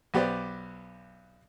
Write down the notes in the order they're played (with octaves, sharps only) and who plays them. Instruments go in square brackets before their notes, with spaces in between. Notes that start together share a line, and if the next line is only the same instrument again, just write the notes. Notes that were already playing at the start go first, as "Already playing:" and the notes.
[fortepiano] B1 B3 G4 C5 D5